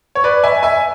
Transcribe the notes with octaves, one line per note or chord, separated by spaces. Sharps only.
C#5
B4 D5
E5 G#5
E5 G#5